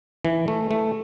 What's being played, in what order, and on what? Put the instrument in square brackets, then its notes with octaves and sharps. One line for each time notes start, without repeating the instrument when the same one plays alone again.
[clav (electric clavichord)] E3
A3
A3